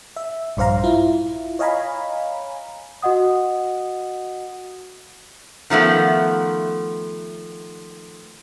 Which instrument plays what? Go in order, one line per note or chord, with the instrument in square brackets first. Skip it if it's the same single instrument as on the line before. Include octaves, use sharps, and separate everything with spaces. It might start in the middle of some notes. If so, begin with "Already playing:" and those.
[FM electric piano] E5
A#1 G2 C5 F5 A#5
E4 F4
C#5 D#5 F5 G#5 A#5 B5
[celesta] F#4 D#5 F#5 D#6
[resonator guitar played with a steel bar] D#3 F3 A3 B3